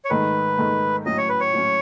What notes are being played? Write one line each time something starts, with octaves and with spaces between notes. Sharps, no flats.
C#5
G#2 D#3 A3 D#4 B4
G#2 D#3 A3 D#4
A2 F#3 C#4 D#5
C#5
B4
C#5
A2 F#3 C#4